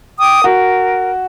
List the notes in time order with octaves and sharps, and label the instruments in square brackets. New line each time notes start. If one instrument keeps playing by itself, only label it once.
[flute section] G5 D6 D#6
[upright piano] F#4 [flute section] A#4